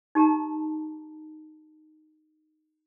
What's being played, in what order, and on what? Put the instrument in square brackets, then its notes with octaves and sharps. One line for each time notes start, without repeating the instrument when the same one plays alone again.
[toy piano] D#4 G4 A5 A#5